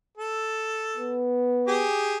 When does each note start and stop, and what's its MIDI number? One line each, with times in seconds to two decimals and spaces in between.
0.18 1.28 69
0.97 1.86 59
1.68 2.18 67
1.68 2.18 68